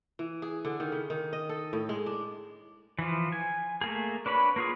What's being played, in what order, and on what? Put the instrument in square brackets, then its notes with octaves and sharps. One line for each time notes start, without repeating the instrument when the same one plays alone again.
[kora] E3
G#4
D3
D#3
C#3
D#3
D#5
A4
A2
G#3
D4
[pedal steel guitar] E3 F3
G#5
A3 A#3 G#4
D4 B4 C#5 B5
A#3 F4 G#4